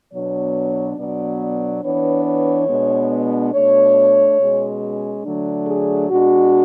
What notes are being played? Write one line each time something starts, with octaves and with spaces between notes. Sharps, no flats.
B2 F#3 B3 D4 C#5
B2 F#3 B3 D4 D5
D5
E3 B3 D4 C#5
C#5
B2 G#3 B3 D4
B2 A3 D4 C#5
B2 G#3 C#4
D3 F#3 A3 D4
G#4
B2 G#3 D4 F#4